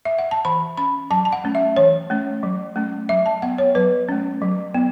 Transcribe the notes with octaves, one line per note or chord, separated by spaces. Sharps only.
E5
F#5
A5
E3 B5
C#4 B5
F#3 A5
A5
F#5
A3 C#4
E5
E3 C#5
A3 C#4
F#3
A3 C#4
F#3 E5
A5
B3 F#5
C#5
F#3 B4
A3 C#4
F#3
B3